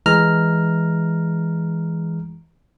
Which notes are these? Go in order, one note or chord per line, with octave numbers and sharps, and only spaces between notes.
E3 G#3 A#5 F6